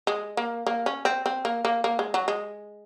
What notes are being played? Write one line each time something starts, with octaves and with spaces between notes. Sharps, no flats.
G#3
A#3
A#3
C#4
C4
C4
A#3
A#3
A#3
G#3
F#3
G#3